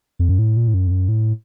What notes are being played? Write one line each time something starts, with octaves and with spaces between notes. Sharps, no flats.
F2
F#2
A2
A#2
A2
F#2
F2
F#2
A2